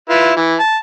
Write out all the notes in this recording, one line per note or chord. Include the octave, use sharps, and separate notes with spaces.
E4 F4 B4
E3
A5